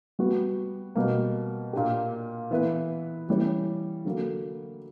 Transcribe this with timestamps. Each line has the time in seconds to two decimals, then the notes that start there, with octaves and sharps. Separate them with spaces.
0.19 G3 B3 F#4
0.95 B2 G3 A#3
1.73 A#2 A#3 D4 G4
2.51 E3 B3 E4 B4
3.29 E3 G3 C#4
4.05 D3 F#3 A#3